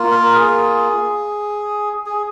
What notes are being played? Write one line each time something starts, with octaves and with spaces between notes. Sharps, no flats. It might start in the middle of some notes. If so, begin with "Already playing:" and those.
Already playing: A#3 F4
A#4
G#4
G#4